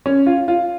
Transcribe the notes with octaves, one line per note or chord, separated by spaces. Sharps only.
C#4
F4
F4